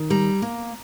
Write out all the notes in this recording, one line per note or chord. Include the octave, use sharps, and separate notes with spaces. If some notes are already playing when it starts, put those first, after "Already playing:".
Already playing: D#3
G3 A#5
A#3